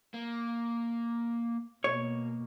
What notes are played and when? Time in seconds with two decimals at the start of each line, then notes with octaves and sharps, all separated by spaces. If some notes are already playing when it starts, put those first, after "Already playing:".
0.14 A#3
1.84 B2 A#3 C#5